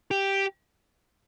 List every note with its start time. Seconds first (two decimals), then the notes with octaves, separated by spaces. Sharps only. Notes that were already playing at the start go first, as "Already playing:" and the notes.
0.11 G4